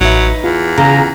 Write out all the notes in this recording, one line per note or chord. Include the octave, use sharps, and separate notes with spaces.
A1 F#3 D#4 B4 E5
E2 F4
C#3 A#5